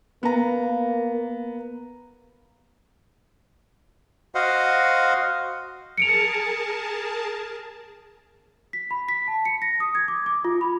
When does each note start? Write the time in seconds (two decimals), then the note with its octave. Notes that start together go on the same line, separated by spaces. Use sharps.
0.23 A#3 B3 A#5
4.35 F#4 C5 D#5 F5 F#5
5.98 G#4 A#4 A5 C#7 D7 F7
8.73 B6
8.91 B5
9.09 B6
9.28 A5
9.45 C#7
9.62 A#6
9.80 D#6
9.95 G#6
10.08 D6
10.26 D6
10.45 F4
10.61 B5